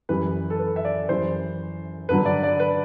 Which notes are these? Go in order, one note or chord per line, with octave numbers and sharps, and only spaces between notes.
F#2 E3 G3 B4
A4
B4
E5
D5
F#2 E3 G3 C5
G2 D3 F#3 B4
D5
D5
B4